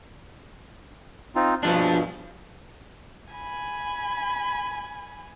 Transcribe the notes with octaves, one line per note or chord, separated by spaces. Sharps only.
C4 D#4 F4
G2 B2 F3 D4
G#5 B5